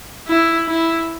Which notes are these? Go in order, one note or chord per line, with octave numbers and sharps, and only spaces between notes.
E4
E4